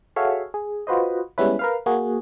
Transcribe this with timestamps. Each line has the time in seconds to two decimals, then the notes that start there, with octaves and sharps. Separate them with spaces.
0.16 F#4 G#4 A4 C#5 E5 F5
0.54 G#4
0.87 F4 F#4 B4 C5 D#5
1.38 G3 G#3 B3 C#4 E4 B4
1.59 A#4 B4 F5
1.86 A#3 F#4 G#4